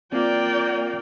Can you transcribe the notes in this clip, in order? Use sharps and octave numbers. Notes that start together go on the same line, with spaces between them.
A#3 C4 F4 D5 G5